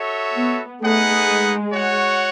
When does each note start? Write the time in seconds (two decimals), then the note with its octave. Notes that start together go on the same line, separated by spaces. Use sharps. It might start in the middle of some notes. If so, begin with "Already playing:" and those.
Already playing: F#4 A4 C#5 E5
0.35 B3
0.81 A3 D#4 G#4 B4 F#5
1.27 G#3
1.72 F#4 C#5 F#5